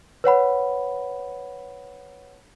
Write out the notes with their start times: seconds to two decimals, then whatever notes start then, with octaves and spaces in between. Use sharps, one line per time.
0.24 B4 C#5 F#5 B5